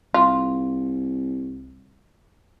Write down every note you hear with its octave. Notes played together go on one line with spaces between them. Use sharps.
C2 F4